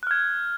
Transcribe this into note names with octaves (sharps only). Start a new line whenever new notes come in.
F6 F#6 G#6